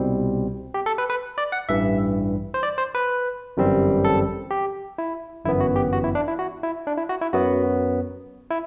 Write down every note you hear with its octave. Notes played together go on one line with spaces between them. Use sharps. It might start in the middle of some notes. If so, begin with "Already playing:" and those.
Already playing: C2 B2 G3 C4
G4
A4
B4
B4
D5
F#5
A1 G2 E3 E5
C5
D5
C5
B4
G1 F#2 E3 G3 C4
A4
G4
E4
G1 F#2 E3 B3 E4
F#4
G4
F#4
E4
D4
E4
F#4
E4
D4
E4
F#4
E4
F#2 F#3 B3 F#4
E4